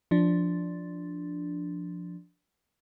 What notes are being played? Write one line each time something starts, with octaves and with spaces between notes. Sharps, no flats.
F3 D4